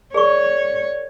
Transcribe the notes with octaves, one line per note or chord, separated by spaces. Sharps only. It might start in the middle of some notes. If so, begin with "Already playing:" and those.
G#4 A#4 C#5 D5 C#6